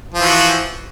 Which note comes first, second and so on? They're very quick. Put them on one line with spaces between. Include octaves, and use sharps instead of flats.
F3 E3 F#4